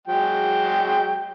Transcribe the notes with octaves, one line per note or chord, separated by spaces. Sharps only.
F#3 G#3 G5